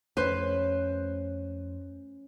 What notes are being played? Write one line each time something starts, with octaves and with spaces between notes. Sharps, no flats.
F2 A3 C#4 B4 C5